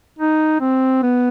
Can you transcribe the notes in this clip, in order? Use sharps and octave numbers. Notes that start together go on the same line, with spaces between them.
D#4
C4
B3